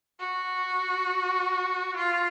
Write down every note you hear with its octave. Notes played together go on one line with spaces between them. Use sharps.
F#4
F4